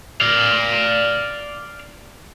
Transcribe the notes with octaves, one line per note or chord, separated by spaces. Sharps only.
D5 F5